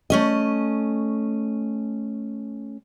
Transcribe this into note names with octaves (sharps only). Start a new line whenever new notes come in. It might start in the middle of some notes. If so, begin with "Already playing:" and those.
A3 C#4 D#5